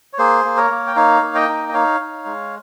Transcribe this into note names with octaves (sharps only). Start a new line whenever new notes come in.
C#5
A#3 G#4 C5
A#3
A#4 C#5
A#3
G5
D#4 C#5 F5
A#3
D#5 G5
D#4
D#5
D#4 C#5 F5
D#4
G#3